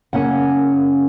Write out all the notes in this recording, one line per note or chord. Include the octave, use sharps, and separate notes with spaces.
F#2 C#3 A#3 C#4 F#5